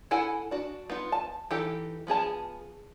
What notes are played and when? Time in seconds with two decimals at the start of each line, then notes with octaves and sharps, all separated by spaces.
0.11 E4 A4 F#5 G#5
0.51 D4 F#4
0.90 B3 D#4 F4
1.12 A5
1.51 E3 D#4 G4 A4 G5
2.07 F3 B3 G#4 A5